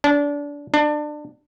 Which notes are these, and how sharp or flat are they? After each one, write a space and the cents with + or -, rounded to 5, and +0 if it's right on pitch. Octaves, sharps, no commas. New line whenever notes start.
D4 -25
D4 +25